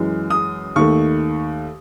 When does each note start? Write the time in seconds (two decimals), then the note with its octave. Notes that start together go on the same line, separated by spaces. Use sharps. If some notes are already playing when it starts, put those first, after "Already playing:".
Already playing: F#2 E3 G#3
0.30 D#6
0.76 D#2 D#3 A3 C#6